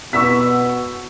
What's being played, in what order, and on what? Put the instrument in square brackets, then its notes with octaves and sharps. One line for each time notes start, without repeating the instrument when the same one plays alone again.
[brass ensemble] B2 B3 [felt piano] C#6 E6 B6